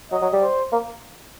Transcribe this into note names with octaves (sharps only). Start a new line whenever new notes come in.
F#3 D#5
F#3
G3
C5
A#3